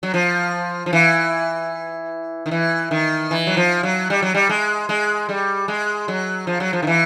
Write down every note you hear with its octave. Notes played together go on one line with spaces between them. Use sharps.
F#3
F3
F3
E3
D#3
E3
D#3
E3
F#3
F3
F#3
G3
F#3
G3
G#3
G#3
G3
G#3
F#3
F3
F#3
F3
D#3
E3